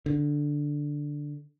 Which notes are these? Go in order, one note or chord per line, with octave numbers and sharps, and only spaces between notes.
D3